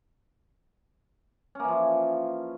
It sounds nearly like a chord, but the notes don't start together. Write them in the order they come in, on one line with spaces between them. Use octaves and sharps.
C#4 A#3 E3 F3